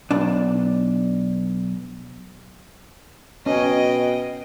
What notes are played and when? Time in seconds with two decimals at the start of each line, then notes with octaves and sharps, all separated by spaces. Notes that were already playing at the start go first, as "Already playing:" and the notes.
0.11 B1 D4
3.46 B2 C#4 D#5 G5